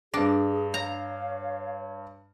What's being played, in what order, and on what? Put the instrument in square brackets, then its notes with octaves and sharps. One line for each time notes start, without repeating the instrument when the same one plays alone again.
[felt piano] G2 A#6 [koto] D4 [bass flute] G#4
[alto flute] C#5 [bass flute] F5 [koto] A#5